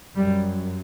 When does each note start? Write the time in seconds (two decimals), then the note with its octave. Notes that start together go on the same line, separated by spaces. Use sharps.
0.15 F#2 G3